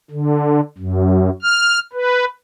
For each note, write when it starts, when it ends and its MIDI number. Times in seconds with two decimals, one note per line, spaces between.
0.11 0.61 50
0.78 1.30 42
1.42 1.79 89
1.93 2.25 71